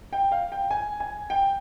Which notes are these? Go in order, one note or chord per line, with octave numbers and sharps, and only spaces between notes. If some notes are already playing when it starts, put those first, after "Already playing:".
G5
F5
G5
G#5
G#5
G5